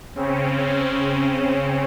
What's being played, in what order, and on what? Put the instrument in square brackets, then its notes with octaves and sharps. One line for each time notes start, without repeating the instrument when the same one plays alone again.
[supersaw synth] C#3 C4 C#4